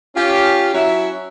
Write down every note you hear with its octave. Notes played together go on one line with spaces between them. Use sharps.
C#4 F4 G4
F#3 C#4 E4 C#5 E5